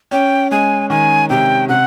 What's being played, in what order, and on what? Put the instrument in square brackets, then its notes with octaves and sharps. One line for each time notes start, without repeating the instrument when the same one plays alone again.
[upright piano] C#4 [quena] G5
[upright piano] G#3 [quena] G#5
[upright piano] D#3 [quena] G#5
[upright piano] C3 [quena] G5
[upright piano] C3 [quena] F#5